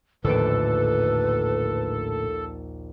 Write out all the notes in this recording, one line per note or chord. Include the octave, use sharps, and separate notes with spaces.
A#1 D#2 A2 D3 A4 B4 D7